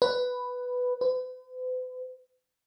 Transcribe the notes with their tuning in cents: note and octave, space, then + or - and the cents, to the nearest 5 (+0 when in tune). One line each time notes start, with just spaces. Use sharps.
B4 +5
B4 +45